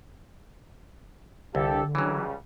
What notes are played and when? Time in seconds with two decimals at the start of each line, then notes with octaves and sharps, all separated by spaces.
1.55 C2 D3 F4 G4 A4
1.95 C#2 C#3 E3 F#3 G3